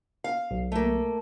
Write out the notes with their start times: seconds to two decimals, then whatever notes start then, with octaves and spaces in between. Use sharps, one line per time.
0.24 F5
0.51 B1
0.72 A3 A#3